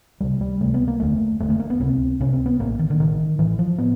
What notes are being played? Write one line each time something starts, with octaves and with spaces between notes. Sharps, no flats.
C#2 C3 G3
G3
C#2 C3 A3
B3
A#3
F1 D#2 D3 A3
F1 D#2 D3 A3
A3
A#3
B3
C#2 C3 C4
C#2 C3 C#4
C4
B3
A1 A2 A#3
D#3
D3
A1 A2 D#3
A1 A2 E3
F3
A2 B3